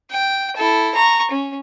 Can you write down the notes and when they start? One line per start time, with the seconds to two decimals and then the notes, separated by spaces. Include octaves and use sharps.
0.11 G5
0.57 E4 A4
0.95 A#5 C#6
1.31 C#4